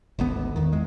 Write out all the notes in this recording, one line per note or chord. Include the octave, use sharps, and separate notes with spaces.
G#1 D2 B3
E2 D#3
E2 G#3